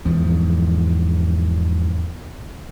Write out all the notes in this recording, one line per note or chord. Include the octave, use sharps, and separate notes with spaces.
E2 G#2 F3